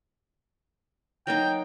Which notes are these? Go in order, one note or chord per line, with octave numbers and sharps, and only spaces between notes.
F#3 A#3 D#4 G5